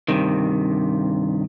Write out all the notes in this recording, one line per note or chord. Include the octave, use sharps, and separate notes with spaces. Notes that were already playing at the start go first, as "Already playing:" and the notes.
G2 C3 D#3